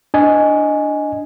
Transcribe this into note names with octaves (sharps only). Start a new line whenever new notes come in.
D4 D#5 G#5